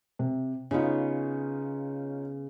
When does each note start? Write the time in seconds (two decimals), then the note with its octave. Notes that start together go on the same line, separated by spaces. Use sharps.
0.19 C3
0.71 C#3 B3 C#4 D#4 F4